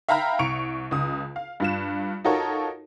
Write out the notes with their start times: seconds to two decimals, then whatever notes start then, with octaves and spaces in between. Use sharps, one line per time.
0.09 E5 F5 G5 A#5 B5 F6
0.39 C2 C#6 C#7 D7 F7
0.91 C#2 D#6
1.36 F5
1.60 G2 F4 E7
2.24 D#4 F4 F#4 A4 A#4 C#5